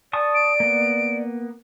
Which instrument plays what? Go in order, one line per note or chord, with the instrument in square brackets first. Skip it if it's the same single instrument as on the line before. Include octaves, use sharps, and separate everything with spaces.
[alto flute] D5 [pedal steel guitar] A5 C#6 D#6
[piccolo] D7
[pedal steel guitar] A#3 B3